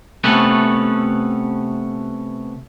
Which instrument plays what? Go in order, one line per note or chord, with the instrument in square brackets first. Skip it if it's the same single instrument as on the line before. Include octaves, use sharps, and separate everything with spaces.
[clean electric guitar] C3 A3 B3 C#4 A4 B4